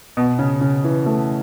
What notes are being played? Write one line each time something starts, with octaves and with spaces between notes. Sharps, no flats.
B2
C#3
C#3
E3
A3